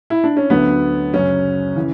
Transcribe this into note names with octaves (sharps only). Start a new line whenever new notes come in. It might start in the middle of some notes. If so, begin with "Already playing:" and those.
E4
D4
C#4
D2 D3 F#3 B3
F#2 C#3 F#3 C#4
C#3 E3